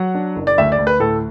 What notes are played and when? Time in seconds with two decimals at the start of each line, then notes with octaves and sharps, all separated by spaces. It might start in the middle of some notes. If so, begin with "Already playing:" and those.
Already playing: F#3 F#5
0.15 D4
0.36 F#1
0.47 D5
0.58 D2 E5
0.72 D5
0.79 D2
0.87 B4
1.00 A2 A4